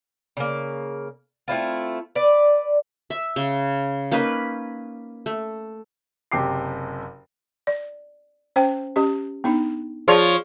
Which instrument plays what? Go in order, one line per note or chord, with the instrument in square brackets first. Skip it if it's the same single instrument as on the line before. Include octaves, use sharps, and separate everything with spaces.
[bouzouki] C#3 A#3
A3 C4 E4 F4
B4 D5
[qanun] E5
C#3
A#3 C#4 D#4 B4
A3
[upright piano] F#1 C3 G4 D6 C7
[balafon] D5
C#4 C5 G5
C#4 G4 D#5
B3 D4 D#4
[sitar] F3 F4 C#5 [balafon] G#4 D5